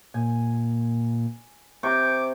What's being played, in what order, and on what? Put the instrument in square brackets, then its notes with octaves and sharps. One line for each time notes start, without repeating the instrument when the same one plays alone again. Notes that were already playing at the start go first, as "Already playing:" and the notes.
[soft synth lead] A#2 [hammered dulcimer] G#5
[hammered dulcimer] C3 G5 C#6 [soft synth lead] D6